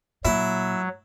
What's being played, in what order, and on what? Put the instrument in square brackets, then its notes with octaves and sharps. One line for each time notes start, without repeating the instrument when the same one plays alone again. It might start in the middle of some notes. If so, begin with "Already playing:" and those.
[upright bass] A#2 [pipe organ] F#3 [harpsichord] E4